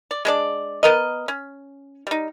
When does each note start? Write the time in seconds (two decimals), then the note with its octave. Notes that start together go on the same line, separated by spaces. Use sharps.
0.11 D5
0.25 G#3 D4 D5
0.83 B3 A#4 D#5
1.28 C#4
2.07 G3 D#4